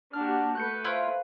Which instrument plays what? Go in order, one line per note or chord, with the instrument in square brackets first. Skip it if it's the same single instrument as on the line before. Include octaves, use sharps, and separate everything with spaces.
[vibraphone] A#3 F#5 A5 [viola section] D4 F#4 G4 [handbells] F6
[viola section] A3 B4 [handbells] F#6 G6 C#7
[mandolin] E4 F4 [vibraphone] C5 F5